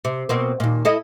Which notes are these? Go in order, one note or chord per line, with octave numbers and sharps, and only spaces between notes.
C3
B2 A#3 C4
D#2 A#2
E4 A4 D#5